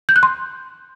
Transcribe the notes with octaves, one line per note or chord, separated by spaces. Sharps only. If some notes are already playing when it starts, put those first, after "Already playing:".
G6
F#6
C6